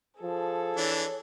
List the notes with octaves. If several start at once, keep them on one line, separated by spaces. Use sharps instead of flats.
F3 G#4 A4
E3 D4 C#5